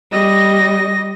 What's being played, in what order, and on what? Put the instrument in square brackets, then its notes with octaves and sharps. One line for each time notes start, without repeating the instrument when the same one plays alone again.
[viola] G3 [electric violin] D#5 A#6